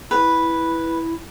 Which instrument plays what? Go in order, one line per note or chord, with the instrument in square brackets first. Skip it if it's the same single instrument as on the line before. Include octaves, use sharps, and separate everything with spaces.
[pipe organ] E4 [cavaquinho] B4